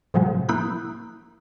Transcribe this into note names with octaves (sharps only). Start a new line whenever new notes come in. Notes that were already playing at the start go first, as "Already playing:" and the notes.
A2 C3 F3 F#3 G#3
A#3 E4 B5 D#6 F#6 G6